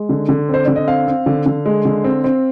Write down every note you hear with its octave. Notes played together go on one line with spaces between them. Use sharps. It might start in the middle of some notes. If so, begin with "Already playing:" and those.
Already playing: G#3
D3
D3
C4 C5
D3 D5
D#5
C4 F5
C4
D3
D3
G#3
D3
C4
C4